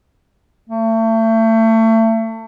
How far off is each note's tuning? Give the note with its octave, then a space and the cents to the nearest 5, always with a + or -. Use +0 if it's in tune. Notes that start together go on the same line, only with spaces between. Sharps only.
A3 +30